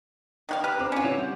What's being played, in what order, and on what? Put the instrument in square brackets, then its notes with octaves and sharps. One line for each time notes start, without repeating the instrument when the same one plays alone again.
[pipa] D#3 F#4 F5
[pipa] G4 B4 [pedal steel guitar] A#5 F6 F#6
[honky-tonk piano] D3 C4 D6
[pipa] C#4 F4
[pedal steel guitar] E4 F#4 C#5
G3 F#5 G6